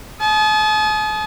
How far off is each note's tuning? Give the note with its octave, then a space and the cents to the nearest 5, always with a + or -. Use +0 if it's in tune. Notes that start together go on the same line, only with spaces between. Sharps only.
A5 -45 D#6 +0